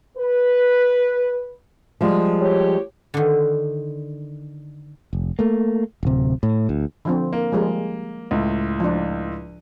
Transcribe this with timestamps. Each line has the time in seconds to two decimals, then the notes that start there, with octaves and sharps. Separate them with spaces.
0.17 B4
2.01 F3 G3 G#3
2.40 G4 C#5
3.14 D3 D#3
5.13 F1
5.39 A3 A#3
6.03 D1 C3
6.43 A2
6.69 D2
7.05 D3 F3 C4
7.33 A#3
7.52 F3 G3 G#3
8.31 C#2 A2
8.80 F3 D4